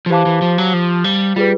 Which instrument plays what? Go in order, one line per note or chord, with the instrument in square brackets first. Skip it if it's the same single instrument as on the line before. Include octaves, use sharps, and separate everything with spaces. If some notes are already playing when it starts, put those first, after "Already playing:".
[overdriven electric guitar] F3
[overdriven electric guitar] E3 [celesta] G4 C5 F5 A5 D6
[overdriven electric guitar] E3
F3
F#3
F3
G3
[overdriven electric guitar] G3 [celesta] F4 G#4 B4